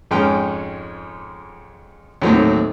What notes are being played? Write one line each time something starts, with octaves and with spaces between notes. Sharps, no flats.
F2 G#2 G#3 C#4 G5 F6
D#2 A2 F#3 A3 C4 D#4